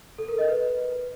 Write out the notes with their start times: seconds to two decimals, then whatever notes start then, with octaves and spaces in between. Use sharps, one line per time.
0.18 A4
0.28 A#4
0.38 D#5
0.48 B4